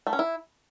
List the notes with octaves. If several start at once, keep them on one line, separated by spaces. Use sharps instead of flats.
A3
C#4
E4